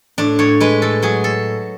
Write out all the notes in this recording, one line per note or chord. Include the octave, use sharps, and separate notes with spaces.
A2 D4
A2 C#5
G#3 B4
A2 A4
F#3 G#4
A4